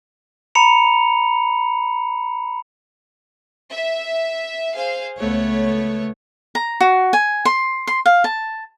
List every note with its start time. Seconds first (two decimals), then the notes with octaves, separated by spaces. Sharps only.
0.55 A#5 B5 C#7 F7
3.72 E5
4.75 G#4 C5 F5
5.18 C#2 A3 B3 C#5
6.55 A#5
6.81 F#4
7.13 G#5
7.45 C6
7.87 C6
8.06 F5
8.24 A5